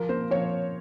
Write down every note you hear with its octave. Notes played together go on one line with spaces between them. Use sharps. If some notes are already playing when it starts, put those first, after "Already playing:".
Already playing: F3 A#4
A#3 C5
F3 C#5